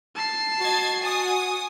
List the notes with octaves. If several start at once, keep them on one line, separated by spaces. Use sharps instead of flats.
A5 C7
F#4 D#5 G#6 A6
G#5 D#6